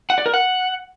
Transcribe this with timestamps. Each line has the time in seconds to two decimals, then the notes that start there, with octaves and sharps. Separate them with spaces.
0.10 F#5
0.18 D5
0.26 A#4
0.34 F#5